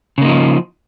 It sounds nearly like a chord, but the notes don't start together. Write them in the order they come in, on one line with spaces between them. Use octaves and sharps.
C#3 A#3 D#4 F3